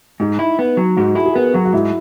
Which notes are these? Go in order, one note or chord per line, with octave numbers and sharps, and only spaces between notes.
G#2 D#4
E4
B3
F#3
G#2 F#4
E4 G#4
G#4
B3 A#4
F#3 F#4
F#4
G#2 E4